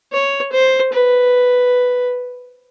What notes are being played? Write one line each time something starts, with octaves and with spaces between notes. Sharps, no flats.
C#5
C5
B4